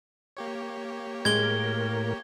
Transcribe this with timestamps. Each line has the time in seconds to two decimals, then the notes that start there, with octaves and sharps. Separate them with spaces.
0.37 A#3 G4 C#5
1.25 A2 G#3 A#4 G#6 G7